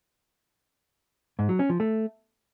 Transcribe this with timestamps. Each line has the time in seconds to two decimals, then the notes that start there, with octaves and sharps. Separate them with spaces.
1.39 G#2
1.49 F#3
1.59 C#4
1.70 F3
1.80 A3